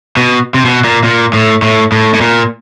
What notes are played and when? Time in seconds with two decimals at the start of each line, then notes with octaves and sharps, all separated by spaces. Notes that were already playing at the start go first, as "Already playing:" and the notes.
0.17 B2
0.54 C3
0.65 B2
0.84 A#2
1.04 A#2
1.33 A2
1.62 A2
1.92 A2
2.14 A2
2.21 A#2